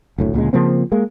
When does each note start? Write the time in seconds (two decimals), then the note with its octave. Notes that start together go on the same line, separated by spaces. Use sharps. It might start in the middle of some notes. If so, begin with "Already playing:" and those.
0.18 F#1 D2 A2
0.34 D2 A#2 C#3 G#3
0.53 C#3 F3 A#3 C4
0.92 G#3 A#3